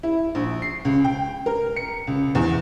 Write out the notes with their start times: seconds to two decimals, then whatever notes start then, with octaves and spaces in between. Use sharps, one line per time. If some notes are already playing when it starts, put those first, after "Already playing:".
0.03 E4
0.35 A#1
0.62 C7
0.85 C#2
1.04 G5
1.46 A#4
1.76 C#7
2.07 C#2
2.35 E2